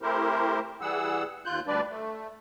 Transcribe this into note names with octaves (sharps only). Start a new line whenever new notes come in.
A3 C4 E4 G4 A#4 C5
E3 G3 G#4 F#5 E6
D#2 F4 F#6 G6
D2 G3 D4 B4 D5
A3